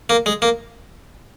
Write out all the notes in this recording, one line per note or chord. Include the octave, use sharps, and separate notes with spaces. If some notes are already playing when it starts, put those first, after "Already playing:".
A#3
G#3
A#3